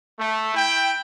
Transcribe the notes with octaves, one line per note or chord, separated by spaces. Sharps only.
A3
E4 G5